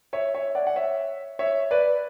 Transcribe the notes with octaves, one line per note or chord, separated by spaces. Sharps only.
C#5 E5
C#5 E5
D5 F#5
F#5
C#5 E5
C#5 E5
B4 D5